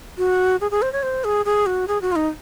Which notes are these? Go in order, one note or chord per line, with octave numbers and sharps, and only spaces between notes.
F#4
G#4
G#4
C5
C#5
C5
G#4
G#4
F#4
G#4
F#4
F4
D#4